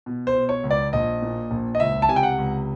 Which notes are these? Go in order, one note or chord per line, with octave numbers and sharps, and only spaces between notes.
B2
C5
B2
C#5
C#2
D5
A#1 D#5
A#2
A#1
D#5
C#2 E5
A5
C3 G#5
G5
F#5
C#2